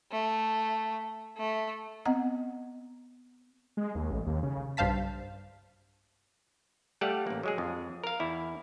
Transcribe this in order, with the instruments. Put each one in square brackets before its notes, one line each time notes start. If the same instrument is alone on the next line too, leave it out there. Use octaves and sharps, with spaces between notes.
[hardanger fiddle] A3
A3
[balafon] B3 C4 D#5 F#5 A#5
[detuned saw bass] G#3
D#2
A1
D#2
C#3
[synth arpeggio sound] B1 G2 C5 F5 A5 B6
[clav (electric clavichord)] G3 A3 G4 D5 F5 F#5
A1 A#3
F#3 G#3 G#4
F2
A#4 F5
E2 E4